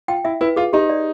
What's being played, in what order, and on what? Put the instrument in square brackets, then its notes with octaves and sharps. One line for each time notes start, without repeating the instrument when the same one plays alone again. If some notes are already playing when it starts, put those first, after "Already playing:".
[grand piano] F4 [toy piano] G5
[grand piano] E4 [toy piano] E5
[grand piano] E4 [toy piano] B4
[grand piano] F4 [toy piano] G#4
[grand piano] D#4 [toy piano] G4
[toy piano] D5